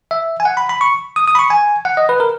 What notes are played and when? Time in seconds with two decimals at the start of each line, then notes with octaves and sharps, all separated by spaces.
0.11 E5
0.40 G#5
0.45 F#5
0.57 B5
0.69 B5
0.81 C#6
1.16 D#6
1.28 D#6
1.35 B5
1.39 C#6
1.50 G#5
1.85 F#5
1.97 D#5
2.09 B4
2.20 A#4